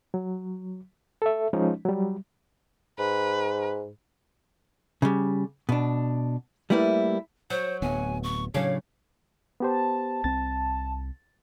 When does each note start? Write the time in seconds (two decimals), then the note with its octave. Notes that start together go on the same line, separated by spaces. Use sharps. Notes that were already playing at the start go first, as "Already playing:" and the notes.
0.14 F#3
1.22 A4 E5
1.53 F3 G#3 C#4 D#4
1.85 F#3 G3
2.99 G#2 B4
5.02 C#3 G3
5.69 B2 D4
6.70 G3 A3 A#3 E4 A4 B4
7.50 F#3 C5
7.82 D1 B3 G#5
8.23 C#6
8.54 A2 C#3 F#3 C#4 D4 F5
9.60 B3 G4 C5 A5
10.24 C2 C4 A6